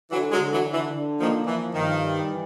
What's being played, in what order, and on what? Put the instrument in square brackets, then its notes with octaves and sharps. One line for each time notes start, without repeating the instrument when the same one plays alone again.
[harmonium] D3 [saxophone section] E3 F#3
[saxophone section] F#3 G#3
[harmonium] D3
[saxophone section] E3 F#3
[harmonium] D3
[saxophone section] E3
[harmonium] D3
[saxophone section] D#3 F3 [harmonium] A#3
[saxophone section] E3 [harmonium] F3
[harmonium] G2 [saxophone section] D#3
[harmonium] G3
E3